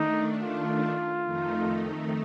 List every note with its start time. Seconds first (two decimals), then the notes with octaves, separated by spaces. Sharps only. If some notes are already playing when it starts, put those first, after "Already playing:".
Already playing: D#3 A3 D4 D#4
0.42 F4
1.24 F2 D#3 A3 D#4